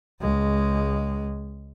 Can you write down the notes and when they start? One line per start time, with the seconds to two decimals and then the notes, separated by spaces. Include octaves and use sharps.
0.21 C#2 G#3